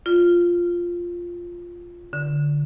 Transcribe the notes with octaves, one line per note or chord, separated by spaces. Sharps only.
F4
D3